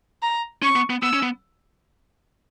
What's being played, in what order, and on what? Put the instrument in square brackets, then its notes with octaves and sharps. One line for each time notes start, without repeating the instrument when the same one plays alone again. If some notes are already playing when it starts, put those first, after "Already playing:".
[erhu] A#5
[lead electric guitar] C#4 [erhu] C#6
[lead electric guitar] B3
B3
[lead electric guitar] B3 [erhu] E6
[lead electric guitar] C#4
B3